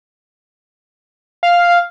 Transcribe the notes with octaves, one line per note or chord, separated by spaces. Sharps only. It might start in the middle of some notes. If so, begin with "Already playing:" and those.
F5